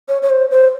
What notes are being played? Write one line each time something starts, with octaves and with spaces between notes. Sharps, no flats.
C#5
C#5
C5
C5